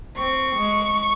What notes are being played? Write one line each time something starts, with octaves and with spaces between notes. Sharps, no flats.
C4 C#6
G#3